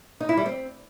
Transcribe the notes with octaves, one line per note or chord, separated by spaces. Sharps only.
D#4
E4
G3
C4